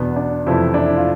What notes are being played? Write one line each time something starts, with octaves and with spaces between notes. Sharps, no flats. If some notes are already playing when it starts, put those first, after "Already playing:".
Already playing: E2 B2 B3 D4
D4
F2 C3 E3 A3 E4
D4
E4
F4